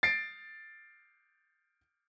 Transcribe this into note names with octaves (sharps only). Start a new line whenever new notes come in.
A6 C7 D7